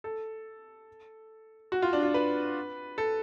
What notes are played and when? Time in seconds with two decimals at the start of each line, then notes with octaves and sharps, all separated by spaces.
0.04 A4
1.72 F#4
1.82 F4
1.93 D4
2.03 F4
2.14 B4
2.98 A4